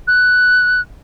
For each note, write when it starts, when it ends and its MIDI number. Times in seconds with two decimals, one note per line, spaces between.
0.08 0.81 90